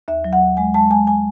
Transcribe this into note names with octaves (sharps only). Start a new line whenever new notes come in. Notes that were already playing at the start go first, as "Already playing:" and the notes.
D#2 E5
F#3
F#5
D#2
G#3 G#5
G#3 A5
G#3 G#5
G#5